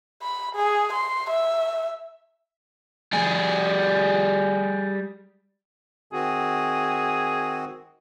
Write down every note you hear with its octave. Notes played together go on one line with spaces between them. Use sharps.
B5
G#4
C6
E5
G3 G#4
D#3 C4 F#4 G#4